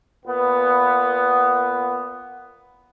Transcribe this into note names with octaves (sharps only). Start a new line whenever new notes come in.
A#2 B3